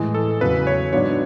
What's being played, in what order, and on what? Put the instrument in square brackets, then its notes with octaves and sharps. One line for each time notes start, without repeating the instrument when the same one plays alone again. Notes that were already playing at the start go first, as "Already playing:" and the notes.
Already playing: [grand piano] A2 E3 G#3
[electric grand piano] A4
[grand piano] E2 C#3 F#3 [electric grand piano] B4
[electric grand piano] C#5
[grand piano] G#2 F#3 B3 D4 [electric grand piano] C#5